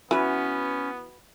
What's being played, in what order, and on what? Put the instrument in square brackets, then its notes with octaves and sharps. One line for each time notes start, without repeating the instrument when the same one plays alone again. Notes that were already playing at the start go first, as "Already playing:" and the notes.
[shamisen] E3 [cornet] B3 [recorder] C#4 [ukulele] F#4 B4